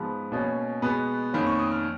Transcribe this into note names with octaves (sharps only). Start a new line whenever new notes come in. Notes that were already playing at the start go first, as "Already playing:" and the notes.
Already playing: G#2 F3 B3 B5
B2 A#3 C#4
B2 G#3 B3
F2 D#3 A#3 C#4 B5
C#6
D#6
F6